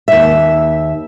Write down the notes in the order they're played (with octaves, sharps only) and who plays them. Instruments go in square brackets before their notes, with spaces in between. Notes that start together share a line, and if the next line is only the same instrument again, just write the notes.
[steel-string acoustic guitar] D#2 E5